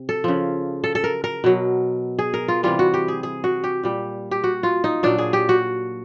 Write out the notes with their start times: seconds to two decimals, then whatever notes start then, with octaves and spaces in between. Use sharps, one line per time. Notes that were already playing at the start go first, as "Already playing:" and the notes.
Already playing: C3
0.09 A4
0.24 C#3 F3
0.84 A4
0.95 A4
1.04 A#4
1.24 A#4
1.44 B2 F#3
2.19 G#4
2.34 A#4
2.48 F4
2.63 C3 E3 G3 F4
2.79 F#4
2.94 G4
3.08 G#4
3.23 G#4
3.44 F#4
3.64 G4
3.84 A#2 G3
4.31 G4
4.44 F#4
4.63 F4
4.84 D#4
5.03 A#2 F#3 D4
5.18 G#4
5.33 G4
5.49 F#4